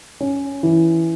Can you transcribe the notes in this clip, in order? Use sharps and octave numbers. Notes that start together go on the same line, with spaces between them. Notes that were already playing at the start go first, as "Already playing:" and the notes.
C#4
E3